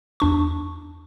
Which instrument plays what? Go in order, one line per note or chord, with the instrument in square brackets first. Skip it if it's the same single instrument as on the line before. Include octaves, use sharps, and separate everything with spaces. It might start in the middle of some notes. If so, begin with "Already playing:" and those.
[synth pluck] E2 D4 C#6